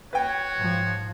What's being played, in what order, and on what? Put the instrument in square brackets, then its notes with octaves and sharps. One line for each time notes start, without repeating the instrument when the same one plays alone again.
[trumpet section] F#4 C#5 [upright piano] B4 G5
[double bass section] G#2 F3